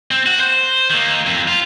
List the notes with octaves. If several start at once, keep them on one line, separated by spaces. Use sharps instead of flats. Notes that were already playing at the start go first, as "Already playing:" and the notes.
C4
F#4
C5
D#3 A#3
F2
F4